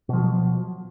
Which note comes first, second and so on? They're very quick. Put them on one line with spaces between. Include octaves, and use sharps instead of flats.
B2 F3 F#3